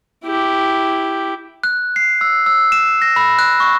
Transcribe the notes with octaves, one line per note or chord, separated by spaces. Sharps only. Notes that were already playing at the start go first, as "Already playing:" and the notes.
E4 G4
F#6
C7
E6
E6
E7
A#6
B5
F#6
C#6